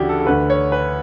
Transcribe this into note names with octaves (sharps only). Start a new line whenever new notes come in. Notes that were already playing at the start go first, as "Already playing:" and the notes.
Already playing: D2 C#3 E3 D4 E4 F#4 G4
A4
A4
D2 D3 B4
C#5
B4